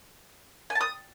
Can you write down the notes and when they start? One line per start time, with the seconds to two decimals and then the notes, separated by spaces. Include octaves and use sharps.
0.70 G#5
0.75 A5
0.81 D#6